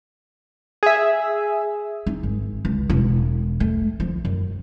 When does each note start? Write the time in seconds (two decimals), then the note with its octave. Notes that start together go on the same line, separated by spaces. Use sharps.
0.83 G#4 E5
2.06 D#4
2.23 G#1
2.65 C#2
2.89 E1
3.60 A3
4.00 F3
4.25 F#2